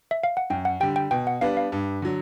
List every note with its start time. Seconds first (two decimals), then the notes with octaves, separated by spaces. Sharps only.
0.11 E5
0.24 F5
0.37 F#5
0.50 F#2 G5
0.65 F#5
0.80 D3 G3 G5
0.96 G5
1.11 B2 G5
1.27 F#5
1.41 G3 B3 D4 F5
1.57 F5
1.72 G2
2.02 D3 F#3